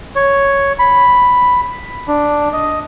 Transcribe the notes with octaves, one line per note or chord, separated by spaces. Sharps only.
C#5
B5
D4
D#5